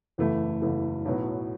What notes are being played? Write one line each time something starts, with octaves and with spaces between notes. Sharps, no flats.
F#1 E2 E3 A3 E4
F#1 E2 E3 A3 E4
B1 A2 F#3 B3